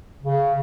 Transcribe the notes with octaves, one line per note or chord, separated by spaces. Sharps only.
C#3